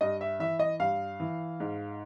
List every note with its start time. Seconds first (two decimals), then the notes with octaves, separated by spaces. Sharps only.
0.01 G2 D#5
0.21 E5
0.40 E3 E5
0.59 D#5
0.79 G2 F5
1.20 E3
1.60 G#2